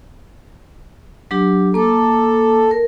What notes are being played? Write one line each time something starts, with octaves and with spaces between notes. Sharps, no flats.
F#3 D4 G4
A#3 A4 D6
A#4